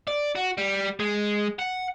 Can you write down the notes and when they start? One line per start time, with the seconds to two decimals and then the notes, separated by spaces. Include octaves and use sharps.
0.08 D5
0.35 F#4
0.58 G3
1.00 G#3
1.59 F#5